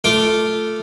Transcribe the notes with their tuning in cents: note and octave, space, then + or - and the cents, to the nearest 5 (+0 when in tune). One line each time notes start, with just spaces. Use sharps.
A3 +0 F4 +0 D6 +0